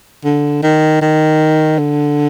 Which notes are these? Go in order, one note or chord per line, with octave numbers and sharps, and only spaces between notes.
D3
D#3
D#3
D3